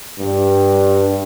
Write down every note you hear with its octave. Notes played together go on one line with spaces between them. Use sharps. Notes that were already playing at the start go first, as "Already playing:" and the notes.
G2